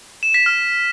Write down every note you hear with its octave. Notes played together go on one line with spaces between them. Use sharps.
E7
B6
F6